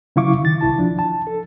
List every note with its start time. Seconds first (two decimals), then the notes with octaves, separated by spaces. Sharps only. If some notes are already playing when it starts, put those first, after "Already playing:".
0.16 C#3 F#3 E4 F5 C#6 D6
0.42 D#3 A6
0.61 C2 E4 A5
0.78 F3 D4
0.99 A5
1.27 A4